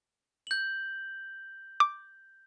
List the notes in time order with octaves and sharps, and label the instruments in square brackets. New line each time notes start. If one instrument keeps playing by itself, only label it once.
[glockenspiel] G6 F#7
[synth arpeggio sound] D6